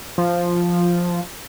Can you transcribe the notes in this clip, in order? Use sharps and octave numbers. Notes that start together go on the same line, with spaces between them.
F3